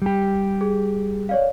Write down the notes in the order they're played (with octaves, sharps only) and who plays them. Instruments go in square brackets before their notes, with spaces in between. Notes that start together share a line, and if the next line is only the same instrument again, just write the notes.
[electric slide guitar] G3 G4
[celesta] G#4
C#5 D5 F5